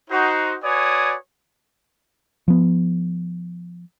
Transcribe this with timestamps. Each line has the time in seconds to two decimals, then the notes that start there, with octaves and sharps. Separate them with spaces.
0.10 D#4 F#4 C5
0.63 F#4 B4 C#5 D5 G#5 D#6
2.48 F3 B3